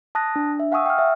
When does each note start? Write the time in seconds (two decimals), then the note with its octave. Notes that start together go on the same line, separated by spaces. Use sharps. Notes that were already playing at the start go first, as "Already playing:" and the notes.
0.15 A5 D#6 F#6 A#6
0.36 D4
0.60 E5
0.72 F5 F#5 G#5 C#6 D#6 E6
0.86 G5 F6
0.99 E5